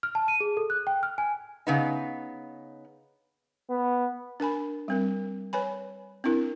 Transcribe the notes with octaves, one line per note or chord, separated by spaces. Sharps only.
F6
A5
D#7
G#4
A4
F#6
G5
F6
G#5
C#3 B3 D#4
B3
D4 A#4 G#5 B5
G3 C4 A#4
B4 C#5 G#5 B5
C4 D4 E4 A#4